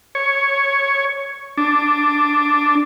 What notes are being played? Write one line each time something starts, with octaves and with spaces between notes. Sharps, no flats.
C#5
D4